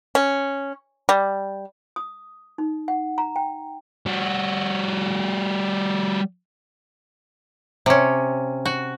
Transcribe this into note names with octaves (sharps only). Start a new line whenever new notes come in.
C#4
G3
D#6
D#4
F#5
A#5
G5
G3 F#4
C3 C#4
F#4